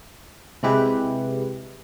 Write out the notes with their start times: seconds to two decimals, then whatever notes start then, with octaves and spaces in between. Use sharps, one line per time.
0.63 C3 G#3 E4 G4 B4